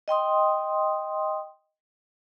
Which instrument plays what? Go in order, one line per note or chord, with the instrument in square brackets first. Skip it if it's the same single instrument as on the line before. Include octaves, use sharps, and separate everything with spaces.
[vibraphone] D#5 G5 C6 D#6